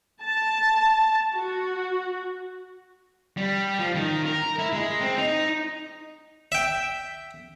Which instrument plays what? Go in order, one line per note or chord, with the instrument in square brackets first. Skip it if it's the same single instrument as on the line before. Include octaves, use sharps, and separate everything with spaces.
[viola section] A5
F#4
[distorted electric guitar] G3
F3
D#3
A#4
E4
G#3
C4
D#4
[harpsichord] E5 G5